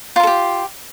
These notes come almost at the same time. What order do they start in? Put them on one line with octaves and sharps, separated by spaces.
F4 A#4 A4 G4